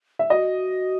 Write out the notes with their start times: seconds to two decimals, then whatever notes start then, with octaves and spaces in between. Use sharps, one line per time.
0.19 E5
0.30 F#4 D#5